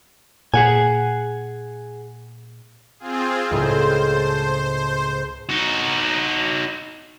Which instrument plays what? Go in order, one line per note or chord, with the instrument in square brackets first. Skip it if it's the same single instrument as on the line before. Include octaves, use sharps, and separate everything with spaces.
[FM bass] A#2 [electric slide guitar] G#4 F#5 G#5
[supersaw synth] C4 F4 G#4
[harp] C#2 A2 G#3 [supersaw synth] C5
[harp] A5
[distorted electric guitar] D#4 F#4